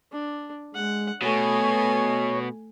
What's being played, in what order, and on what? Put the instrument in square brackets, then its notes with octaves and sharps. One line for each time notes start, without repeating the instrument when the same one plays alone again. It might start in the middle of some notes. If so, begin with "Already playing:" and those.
[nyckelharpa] D4
[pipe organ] G#3 [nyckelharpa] F#5
[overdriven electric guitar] B2 [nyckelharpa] A3 G#5 [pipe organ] C#5